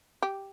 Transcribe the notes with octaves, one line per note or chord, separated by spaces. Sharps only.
G4